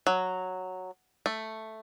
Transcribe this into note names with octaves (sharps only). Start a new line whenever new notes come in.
F#3
A3